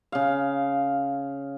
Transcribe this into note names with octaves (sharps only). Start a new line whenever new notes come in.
C#3 F5